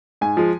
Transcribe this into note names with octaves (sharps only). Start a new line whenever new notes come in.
G#2 G#5
F3 G#3